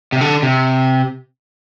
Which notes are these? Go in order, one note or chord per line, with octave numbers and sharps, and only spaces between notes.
C3
D3
C3